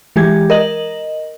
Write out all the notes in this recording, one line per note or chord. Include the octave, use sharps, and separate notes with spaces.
E3 G#3 G4 G#6
A#4 D#5 F#7